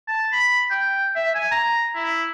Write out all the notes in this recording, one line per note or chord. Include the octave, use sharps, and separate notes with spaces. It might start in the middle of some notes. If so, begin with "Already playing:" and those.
A5
B5
G5
E5
G#5
A#5
E4